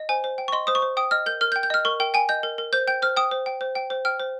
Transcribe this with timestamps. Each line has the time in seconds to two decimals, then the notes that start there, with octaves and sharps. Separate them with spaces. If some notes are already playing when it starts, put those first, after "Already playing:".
Already playing: D#5
0.09 C5 G#5
0.24 C5
0.38 G5
0.48 C#6
0.52 D#5 C6
0.67 C5 D#6
0.75 C#6
0.82 C5
0.97 G5 D#6
1.11 D#5 F6
1.26 A#4 G6
1.41 A#4 F6
1.52 G6
1.56 G5
1.63 G6
1.70 D#5 F6
1.85 A#4 C#6
2.00 A#4 G5
2.14 G5 G#5
2.29 D#5 G6
2.43 A#4
2.58 A#4
2.73 C5 G6
2.87 G5 G6
3.02 C5 F6
3.17 G5 D#6
3.31 C5
3.46 G5
3.61 C5
3.75 G5
3.90 C5
4.05 G5 F6
4.20 C5